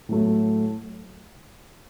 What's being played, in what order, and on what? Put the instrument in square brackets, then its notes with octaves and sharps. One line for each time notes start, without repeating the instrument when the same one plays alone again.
[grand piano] A2 F#3 A3